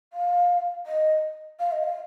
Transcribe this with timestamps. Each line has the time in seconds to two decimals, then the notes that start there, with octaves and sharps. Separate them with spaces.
0.13 F5
0.86 D#5
1.60 F5
1.72 D#5
1.84 F5